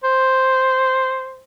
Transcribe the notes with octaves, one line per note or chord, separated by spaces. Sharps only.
C5